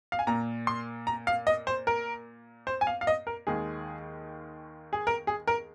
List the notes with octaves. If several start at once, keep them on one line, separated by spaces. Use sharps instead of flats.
F5
G#5
A#2 A#3 A#5
C6
A#5
F5
D#5
C5
A#4
C5
G#5
F5
F5
D#5
A#4
D#2 D#3 G#3 G#4
G#4
A#4
G#4
A#4